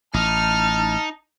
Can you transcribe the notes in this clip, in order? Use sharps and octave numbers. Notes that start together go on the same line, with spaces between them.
A1 D#4 A5 F6